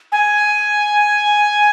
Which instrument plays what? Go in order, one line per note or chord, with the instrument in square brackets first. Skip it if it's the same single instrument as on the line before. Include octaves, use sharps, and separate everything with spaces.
[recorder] G#5